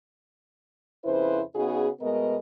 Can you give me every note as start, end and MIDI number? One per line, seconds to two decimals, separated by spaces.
1.04 1.41 41
1.04 1.41 49
1.04 1.41 64
1.04 1.41 71
1.04 1.41 72
1.55 1.88 49
1.55 1.88 59
1.55 1.88 63
1.55 1.88 66
1.55 1.88 68
2.00 2.37 47
2.00 2.37 56
2.00 2.37 57
2.00 2.37 59
2.00 2.37 70
2.00 2.37 75